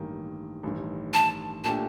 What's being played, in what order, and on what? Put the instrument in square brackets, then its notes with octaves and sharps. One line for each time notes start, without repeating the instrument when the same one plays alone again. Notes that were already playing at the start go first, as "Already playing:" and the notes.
Already playing: [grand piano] A1 G2 D#3 A#3
A1 G2 D#3
[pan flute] A5
[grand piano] A#2 A3 D4 G4 [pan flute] A5